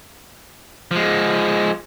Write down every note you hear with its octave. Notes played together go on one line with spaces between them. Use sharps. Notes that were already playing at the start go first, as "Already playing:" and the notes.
F3 G#3